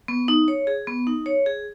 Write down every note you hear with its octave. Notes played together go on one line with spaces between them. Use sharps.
B3
D#4
C#5
G#4
B3
D#4
C#5
G#4